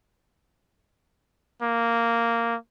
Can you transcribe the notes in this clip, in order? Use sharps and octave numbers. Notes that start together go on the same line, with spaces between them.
A#3